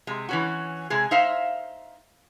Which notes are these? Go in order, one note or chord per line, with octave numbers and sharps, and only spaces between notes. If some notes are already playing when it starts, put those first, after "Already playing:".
C3 G#3
E3 C#4 F#4
C3 G#3 G#4
D#4 C5 E5 F5